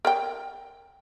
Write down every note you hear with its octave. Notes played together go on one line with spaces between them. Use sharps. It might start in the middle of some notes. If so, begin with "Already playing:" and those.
A#4 D5 G5